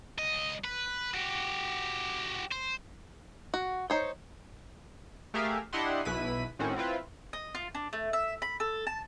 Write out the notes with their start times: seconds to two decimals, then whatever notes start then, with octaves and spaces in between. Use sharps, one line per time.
0.19 C#2 D#5
0.64 B4
1.14 F#4 G4
2.52 C5
3.54 F#4
3.90 D#4 C5 C#5
5.34 A3 G4 G#4 A#4 E5 F5
5.73 D4 E4 G4 D#5 F#5 C6
6.05 B1 B2 E4 B4 B6 D#7
6.59 A2 D#3 C4 C#4 F#4
6.76 C4 E4 F4 B4
7.33 D#5
7.55 F4
7.75 D4
7.93 A3
8.13 E5
8.42 B5
8.60 A4
8.87 A5